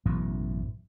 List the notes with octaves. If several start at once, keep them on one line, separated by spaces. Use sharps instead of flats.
A1 F#2 B2 E3